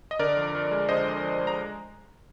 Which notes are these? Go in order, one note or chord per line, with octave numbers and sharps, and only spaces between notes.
D#5
D3 A#4 D5
F2
F2
G#3
D3 C5 D#5
F2
F2
G#3
A#5